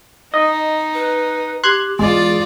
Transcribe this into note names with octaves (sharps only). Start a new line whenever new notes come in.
D#4 D#5
B4
G4 C6 F#6 G#6
E2 G#3 F4 G#4 D5